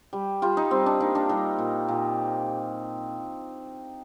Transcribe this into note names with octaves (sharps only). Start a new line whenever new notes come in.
G3
G3 F4
D#4
G3 C4
D4
A#3 D#4
D4
G3 D#4
A#2
A#2